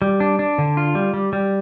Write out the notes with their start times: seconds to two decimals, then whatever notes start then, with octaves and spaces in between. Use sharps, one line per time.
0.02 G3
0.20 D4
0.39 D4
0.58 D3
0.77 F4
0.95 G3
1.14 G3
1.33 G3